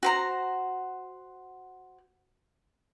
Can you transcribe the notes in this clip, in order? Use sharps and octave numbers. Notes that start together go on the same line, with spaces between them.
F#4 C5 A#5